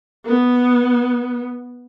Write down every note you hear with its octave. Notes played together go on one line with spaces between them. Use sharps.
B3